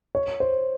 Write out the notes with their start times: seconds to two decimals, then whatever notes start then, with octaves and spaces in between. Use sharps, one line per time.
0.15 C#5
0.40 C5